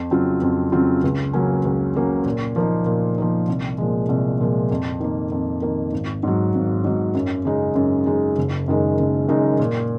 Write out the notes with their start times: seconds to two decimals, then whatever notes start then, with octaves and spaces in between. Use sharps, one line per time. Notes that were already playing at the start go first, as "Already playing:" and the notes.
Already playing: F2
0.11 C#3 F#3 C4 F4
0.42 F2
0.72 C#3 F#3 C4 F4
1.04 C#2
1.33 C#3 F#3 A#3 C#4
1.65 C#2
1.95 C#3 F#3 A#3 C#4
2.26 A#2
2.56 F3 A#3 D#4
2.86 A#2
3.18 F3 A#3 D#4
3.48 C2
3.78 A#2 F3 G#3
4.09 C2
4.40 A#2 F3 G#3
4.71 F2
5.00 D#3 A#3
5.32 F2
5.62 D#3 A#3
5.93 G#1
6.23 G#2 F#3
6.54 G#1
6.84 G#2 F#3
7.14 F#2
7.45 C#3 G#3 D#4
7.75 F#2
8.06 C#3 G#3 D#4
8.38 F#1
8.68 F#2 D#3 G#3 D#4
8.99 F#1
9.28 F#2 D#3 G#3 D#4
9.59 A#2